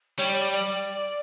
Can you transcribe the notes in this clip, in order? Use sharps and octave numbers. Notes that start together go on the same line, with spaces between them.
G3 C#5
D5
D5
D5